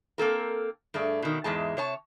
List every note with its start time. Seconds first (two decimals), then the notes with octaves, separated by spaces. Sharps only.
0.18 A#3 C4 A4 A#4
0.94 G2 A3 G#4 D5
1.22 B2 D#3
1.44 E2 G#2 G#3 A5
1.77 C3 C#5 A5